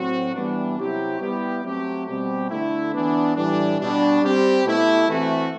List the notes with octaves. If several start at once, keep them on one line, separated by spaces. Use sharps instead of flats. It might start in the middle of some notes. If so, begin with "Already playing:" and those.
Already playing: A2 F#3 C4 F#4
E3 G3 B3 D4
C3 F#3 C4 E4 G4
G3 B3 E4 G4
F#3 A3 C4 G4
B2 G3 C4 G4
D3 A3 E4
E3 B3 D4
A2 E3 G3 D4
B2 G3 D4
G3 C4 G4
B2 A3 E4 G4
E3 A3 C4 F#4